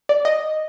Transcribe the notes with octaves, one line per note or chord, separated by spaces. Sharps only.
D5
D#5